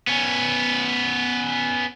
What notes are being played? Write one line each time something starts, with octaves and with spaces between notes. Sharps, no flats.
B3 C#4